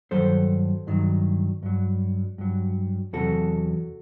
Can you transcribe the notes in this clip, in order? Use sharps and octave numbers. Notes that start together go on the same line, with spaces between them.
G2 D#3 F#3 A4 C5
G2 D#3 F#3
G2 F#3
G2 F#3
E2 C3 F#3 F#4 A4